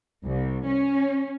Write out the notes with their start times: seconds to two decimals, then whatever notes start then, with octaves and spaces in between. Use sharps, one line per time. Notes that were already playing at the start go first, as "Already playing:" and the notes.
0.24 C2
0.65 C#4